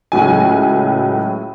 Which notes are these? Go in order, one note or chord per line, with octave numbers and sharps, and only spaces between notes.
C#2 A2 F#3 G#5